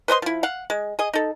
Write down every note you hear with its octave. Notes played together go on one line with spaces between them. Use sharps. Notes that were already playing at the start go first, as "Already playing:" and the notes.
B4 C5 D#5 C6
F3 E4
F5 F#5
G#3
G#4 D#5
D#4 A4